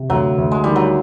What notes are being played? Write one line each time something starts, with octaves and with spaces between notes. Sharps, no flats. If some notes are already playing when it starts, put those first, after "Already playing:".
Already playing: C3
D2 F#3
D2
G#3
D#3 G3
F#3